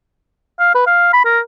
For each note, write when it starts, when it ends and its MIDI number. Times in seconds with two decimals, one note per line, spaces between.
0.60 0.71 77
0.75 0.85 71
0.87 1.13 77
1.14 1.23 83
1.25 1.40 70